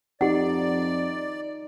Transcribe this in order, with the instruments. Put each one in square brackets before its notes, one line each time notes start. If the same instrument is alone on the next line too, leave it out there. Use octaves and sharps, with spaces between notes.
[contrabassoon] F2 [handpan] D#4 [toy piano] G4 F#5 [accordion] D5